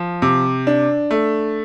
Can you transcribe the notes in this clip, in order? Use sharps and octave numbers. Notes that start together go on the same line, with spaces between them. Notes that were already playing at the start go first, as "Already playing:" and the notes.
Already playing: F3
C3
D4
A3